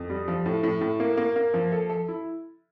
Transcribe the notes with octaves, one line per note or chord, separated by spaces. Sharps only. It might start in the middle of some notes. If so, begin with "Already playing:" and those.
Already playing: F2
G3
F3
A2
A2
A2
A#3
A#3
A#3
F3
A4
A4
E4